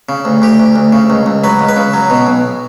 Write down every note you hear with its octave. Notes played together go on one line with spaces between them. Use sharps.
C#3
D2
D2 G4
D2
D2
C#3
C#2
C#2
F#3 B4
C#2
B4
C#3
F#3
B2
B1